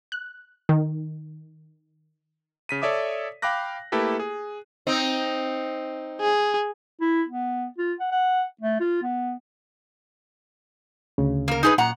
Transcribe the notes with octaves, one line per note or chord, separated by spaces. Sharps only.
F#6
D#3
C#3 B6 D#7
A4 C#5 D5 E5 D6 D#6
F5 G5 B5 D6 F#6 A#6
A3 A#3 E4 G4 A4 B4
G#4
C4 D#4
G#4
E4
B3
F4
F#5
F#5
A3
F4
B3
D2 C#3
A#3 A#4
D#4 G#4 B4
F#2 A#2 F#5 A#5